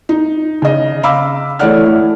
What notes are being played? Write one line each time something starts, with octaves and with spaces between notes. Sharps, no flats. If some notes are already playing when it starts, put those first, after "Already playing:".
D#4
C#3 D#5
F5 B5 D6 E6
E3 A3 C#5 D5 F#5 F6
A3 E4